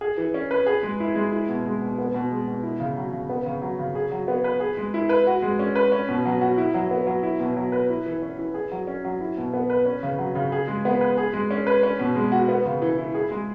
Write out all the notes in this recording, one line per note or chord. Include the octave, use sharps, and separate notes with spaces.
G#4
E3
C#4
B4
G#4
G#3
E4
G#3
E4
B2
G#3
B2
B3
B2
G#3
B2
E4
C#3
F#3
C#3
B3
C#3
F#3
C#3
G#4
F#3
B3
B4
G#4
G#3
E4
B4
F#4
G#3
C#4
B4
C#4
B2
F#3
F#4
E4
F#3
B3
F#3
E4
B2
F#3
B4
E4
E3
C#4
E3
G#4
F#3
C#4
F#3
E4
B2
B3
B4
C#4
C#3
F#3
C#3
G#4
G#3
B3
B4
G#4
G#3
C#4
B4
C#4
B2
G#3
F#4
B3
C#3
E3
E4
G#4
G#3